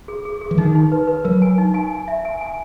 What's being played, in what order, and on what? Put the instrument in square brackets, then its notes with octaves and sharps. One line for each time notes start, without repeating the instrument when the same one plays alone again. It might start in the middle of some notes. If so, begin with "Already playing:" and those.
[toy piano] G#4
G#4
G#4
[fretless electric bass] E3
[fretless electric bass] D#3 [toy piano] D#4
[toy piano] D#4
B4
B4
[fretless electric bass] F#3 [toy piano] A#4
[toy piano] G#5
D#4
G#5
G#5
E5
G#5
G#5